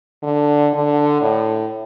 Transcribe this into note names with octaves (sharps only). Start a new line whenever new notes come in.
D3
D3
A2